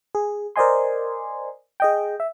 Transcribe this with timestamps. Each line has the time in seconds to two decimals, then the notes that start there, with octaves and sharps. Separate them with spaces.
0.15 G#4
0.56 A#4 C5 D5 D#5 G#5 C6
1.80 G#4 D#5 G5
2.20 E5